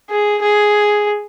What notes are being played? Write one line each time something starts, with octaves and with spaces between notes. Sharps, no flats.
G#4
G#4